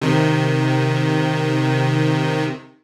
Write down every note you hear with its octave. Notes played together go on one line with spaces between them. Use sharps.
C3 D#3